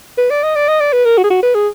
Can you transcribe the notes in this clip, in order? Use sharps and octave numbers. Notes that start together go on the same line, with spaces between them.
B4
D5
D#5
D5
D#5
D5
B4
A#4
F#4
G#4
F#4
B4
G#4